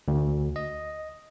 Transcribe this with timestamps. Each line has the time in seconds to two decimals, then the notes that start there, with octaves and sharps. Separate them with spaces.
0.08 D2
0.56 D#5